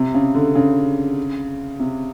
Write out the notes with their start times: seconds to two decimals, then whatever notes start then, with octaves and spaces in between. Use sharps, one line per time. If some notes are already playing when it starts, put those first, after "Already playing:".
Already playing: C3
0.14 C#3
0.34 D3
0.55 C#3
1.79 C3